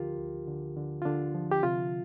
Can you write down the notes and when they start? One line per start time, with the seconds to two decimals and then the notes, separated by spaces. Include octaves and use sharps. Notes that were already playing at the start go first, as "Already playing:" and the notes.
Already playing: D2 D3 F3 F4 G4 A#4
0.19 D2
0.47 D3
0.76 D3
1.02 F4
1.05 D3 D4
1.34 F3
1.51 G4
1.63 C3 F4